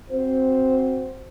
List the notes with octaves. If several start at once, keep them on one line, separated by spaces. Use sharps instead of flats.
C4 F#4 C5